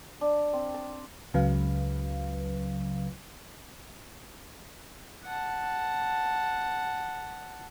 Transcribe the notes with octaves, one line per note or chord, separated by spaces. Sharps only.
D4
C4
A5
C#2 C#3 F#3 B4 F5
F#5 A5